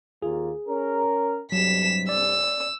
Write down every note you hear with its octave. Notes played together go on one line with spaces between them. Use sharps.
D#2 A#3 F4 G#4
C#4 A#4
G2 C3 F#3 G3 B6 E7
D5 E6